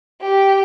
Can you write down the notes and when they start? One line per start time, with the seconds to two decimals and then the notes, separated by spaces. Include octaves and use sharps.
0.22 G4